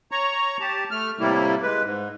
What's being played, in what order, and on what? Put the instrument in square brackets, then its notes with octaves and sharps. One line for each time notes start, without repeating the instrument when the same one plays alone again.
[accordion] C#5 A#5 C#6
G4 A5
A3 F6
A2 C3 G3 A#3 E4
G#3 B4
G#2